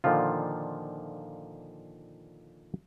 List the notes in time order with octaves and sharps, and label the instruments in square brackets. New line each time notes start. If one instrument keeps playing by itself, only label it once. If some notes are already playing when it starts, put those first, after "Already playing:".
[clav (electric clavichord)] A#2 D3 D#3 F3 F4